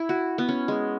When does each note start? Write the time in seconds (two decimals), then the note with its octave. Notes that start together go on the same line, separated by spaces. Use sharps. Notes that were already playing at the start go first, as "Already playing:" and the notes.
Already playing: E4
0.09 F#4
0.38 B3
0.49 C#4
0.68 G#3